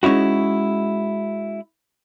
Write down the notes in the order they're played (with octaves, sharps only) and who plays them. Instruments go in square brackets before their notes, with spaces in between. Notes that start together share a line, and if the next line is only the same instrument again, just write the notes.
[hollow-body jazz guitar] G#3 C#4 D#4 E4 F#4